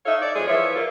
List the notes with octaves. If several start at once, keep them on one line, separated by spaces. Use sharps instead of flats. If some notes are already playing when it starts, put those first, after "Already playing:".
D#4 A4 C#5 E5 F5
D5
F2 G#3 G#4 C#5
E3 F3 C#5 E5
A#3 F4